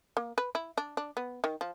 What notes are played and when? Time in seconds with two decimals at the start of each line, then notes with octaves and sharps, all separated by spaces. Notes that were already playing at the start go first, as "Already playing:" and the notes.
0.17 A#3
0.38 B4
0.55 E4
0.78 D4
0.97 D4
1.17 B3
1.44 D#3
1.61 F3